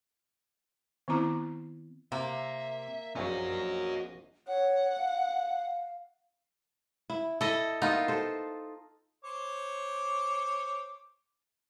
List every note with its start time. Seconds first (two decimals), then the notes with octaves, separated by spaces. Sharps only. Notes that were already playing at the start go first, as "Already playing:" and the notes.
1.08 D#3 B3 C4 E4 A#5 D6
2.12 C3 A#3 E5
3.15 A#1 A#2 C#4 F#4 D#5
4.48 C#5 F#5
4.98 F5
7.10 E4
7.41 E4 A4 D#5
7.82 A#3 B3 D#4 F4
8.08 A4 C5
9.24 C5 C#5 D6